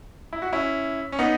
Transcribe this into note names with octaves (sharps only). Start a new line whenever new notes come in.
E4
F#4
C#4 E4
C#4
B3 D#4